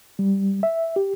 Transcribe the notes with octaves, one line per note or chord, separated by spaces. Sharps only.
G3
E5
G4